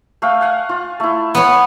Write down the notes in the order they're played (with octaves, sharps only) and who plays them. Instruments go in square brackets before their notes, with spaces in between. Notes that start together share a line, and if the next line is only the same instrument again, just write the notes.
[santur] A3 F5 G5
F5 F#5 G#5
F4
A3 E4
[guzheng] B3 C#5